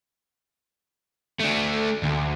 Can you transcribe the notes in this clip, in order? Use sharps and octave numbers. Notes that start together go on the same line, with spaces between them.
A3 D4
D2